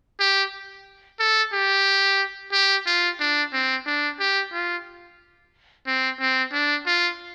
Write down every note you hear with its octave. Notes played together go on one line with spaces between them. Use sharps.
G4
A4
G4
G4
F4
D4
C4
D4
G4
F4
C4
C4
D4
F4